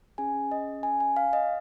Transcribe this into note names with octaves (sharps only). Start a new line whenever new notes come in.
C#4 G#4 G#5
D#5
G#5
G#5
F5
D#5